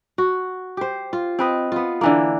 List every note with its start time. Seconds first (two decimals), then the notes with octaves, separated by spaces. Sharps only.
0.18 F#4
0.77 G4 C5
1.13 F4
1.39 C4 B4 D#5
1.72 B3 F4
2.01 D3 E3 A#3